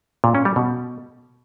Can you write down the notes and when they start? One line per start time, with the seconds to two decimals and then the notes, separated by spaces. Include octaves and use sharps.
0.24 A#2
0.35 C#4
0.45 G3
0.56 B2